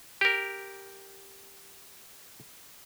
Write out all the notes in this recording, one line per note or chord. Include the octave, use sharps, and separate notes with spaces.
G4 A#4